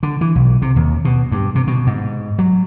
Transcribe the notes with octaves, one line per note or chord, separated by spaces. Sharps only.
D3
E3
B1
C3
D#2
B2
G2
C3
B2
G#2
F#3